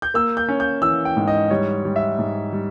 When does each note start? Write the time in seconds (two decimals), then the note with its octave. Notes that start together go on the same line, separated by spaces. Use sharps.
0.02 G6
0.14 A#3 E6
0.37 G6
0.48 C#4
0.60 G6
0.82 E3 E6
1.05 G5
1.17 G#2
1.27 D#5
1.50 G3 C#5
1.85 G3
1.96 E5
2.18 G#2
2.52 G3